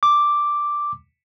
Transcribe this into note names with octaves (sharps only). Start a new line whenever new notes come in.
D6